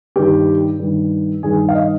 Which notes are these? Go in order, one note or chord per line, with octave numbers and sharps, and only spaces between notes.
G2 D#3 G4
G2 D#3
G2 D#3 G#4
F5
D#5